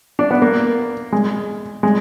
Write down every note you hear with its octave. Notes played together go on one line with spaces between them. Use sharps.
D4
B3
A#3
G#3
G#3